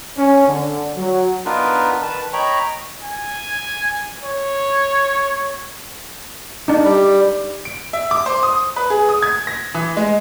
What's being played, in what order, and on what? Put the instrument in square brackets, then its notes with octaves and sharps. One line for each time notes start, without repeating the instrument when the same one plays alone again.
[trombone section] C#4
D3
F#3
[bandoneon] B3 D4 D#4 F4 A#4 B4
D#3 B4 A5
C#5 D#5 G5 A#5 B5 C#6
[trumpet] G#5
C#5
[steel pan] D4 D#4
[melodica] G3
[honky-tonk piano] D7
E5
D6
C5
D#6
B4
G#4
D#6
G#6
A#6
E3
G#3